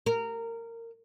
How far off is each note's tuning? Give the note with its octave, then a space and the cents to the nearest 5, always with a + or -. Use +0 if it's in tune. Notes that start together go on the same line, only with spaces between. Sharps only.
A#4 -20